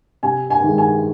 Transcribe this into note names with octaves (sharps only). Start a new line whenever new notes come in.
C3 G#5
G#5
D#3 G#3
G#5